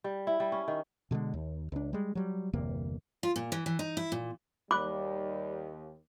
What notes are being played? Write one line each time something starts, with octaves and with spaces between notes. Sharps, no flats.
G3
E4
G3
C#4
D#3
B2 D3 E3 G#3
D#2
C#2 D4
G3 G#3
F#3 G3
G1 E2 C3 A#3
F4
A#2
E3
E3
D#4
E4
A#2
D#2 G3 B5 D6 F#6